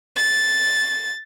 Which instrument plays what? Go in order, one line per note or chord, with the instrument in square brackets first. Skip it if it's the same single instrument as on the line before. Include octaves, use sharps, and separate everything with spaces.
[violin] A6